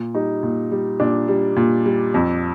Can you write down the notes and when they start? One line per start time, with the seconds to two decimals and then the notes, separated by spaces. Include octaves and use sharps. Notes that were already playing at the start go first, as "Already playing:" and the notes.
Already playing: A#2
0.14 G3 D#4
0.43 A#2
0.72 G3
1.00 A#2 D4
1.28 G3
1.56 A#2
1.86 G3
2.14 F2